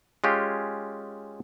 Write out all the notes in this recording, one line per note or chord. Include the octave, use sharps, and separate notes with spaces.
G#3 C#4 F4 G4